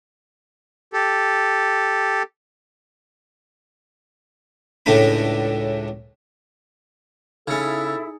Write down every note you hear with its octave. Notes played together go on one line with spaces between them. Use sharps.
G4 A4
C#2 A2 A3 D4 B5
C#3 C#4 D#4 E4 G#4 A4